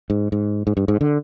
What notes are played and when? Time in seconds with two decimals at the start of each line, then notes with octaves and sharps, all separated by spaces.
0.10 G#2
0.32 G#2
0.67 G#2
0.77 G2
0.88 G#2
1.01 D3